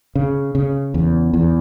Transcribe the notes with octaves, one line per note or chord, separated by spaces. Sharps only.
C#3
C#3
E2
E2